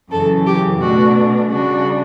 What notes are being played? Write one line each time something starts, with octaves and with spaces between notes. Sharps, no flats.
F#2 C#3 E3 A4
G4
B2 A3 D4 F#4
C#3 G3 D4 F#4